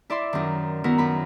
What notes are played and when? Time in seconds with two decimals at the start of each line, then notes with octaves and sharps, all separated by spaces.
0.10 E4 D5 E5 C6
0.33 F#2 D#3
0.84 D#3 B3 E4 F#4 A#4
0.98 F#2 B5